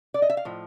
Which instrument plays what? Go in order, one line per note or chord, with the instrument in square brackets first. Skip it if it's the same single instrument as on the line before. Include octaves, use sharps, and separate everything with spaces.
[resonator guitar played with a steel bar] D5
D#5
E5
F5
A2 F3